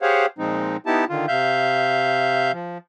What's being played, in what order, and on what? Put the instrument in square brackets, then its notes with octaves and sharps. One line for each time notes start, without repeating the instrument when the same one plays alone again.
[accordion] G4 G#4 C5 C#5 F5 F#5
A#2 F3 G#3 C4 D#4
B3 D#4 E4 G4 A5
D3 D#3 F4
C3 E5 F5 G6
F3